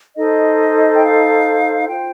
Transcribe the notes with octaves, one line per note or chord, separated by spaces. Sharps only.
D#4 A4 C5 D#5
G5
F5
F4 C5 G5